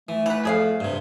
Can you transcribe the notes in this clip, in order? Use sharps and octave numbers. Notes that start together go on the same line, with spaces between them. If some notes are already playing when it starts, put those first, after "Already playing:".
E3 A3
E3 B4 F#5
F2 G#4 D5 F5
G2 C3